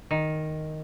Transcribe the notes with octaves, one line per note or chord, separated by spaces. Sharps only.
D#3